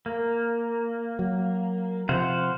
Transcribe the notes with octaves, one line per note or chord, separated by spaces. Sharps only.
A#3
F#3
C3 F3 C5 F5 F#5